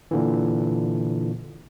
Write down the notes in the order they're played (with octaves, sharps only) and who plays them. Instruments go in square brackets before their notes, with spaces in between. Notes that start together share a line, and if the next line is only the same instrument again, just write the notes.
[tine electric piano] A#2 D3 E3